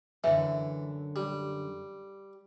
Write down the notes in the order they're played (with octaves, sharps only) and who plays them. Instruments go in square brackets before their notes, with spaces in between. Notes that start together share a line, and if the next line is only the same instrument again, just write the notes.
[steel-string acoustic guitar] F#2 D3 [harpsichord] E3 [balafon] E5
[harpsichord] G3